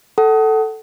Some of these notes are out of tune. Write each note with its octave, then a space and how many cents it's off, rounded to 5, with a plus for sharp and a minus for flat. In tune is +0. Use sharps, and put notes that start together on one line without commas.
A4 +0 F#5 +30